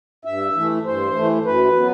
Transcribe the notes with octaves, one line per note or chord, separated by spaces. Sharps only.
G2 E5
E3 A3
G2 C5
E3 A3
F#2 B4
F#3 B3